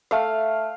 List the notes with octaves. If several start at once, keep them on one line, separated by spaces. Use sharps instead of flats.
A3 F5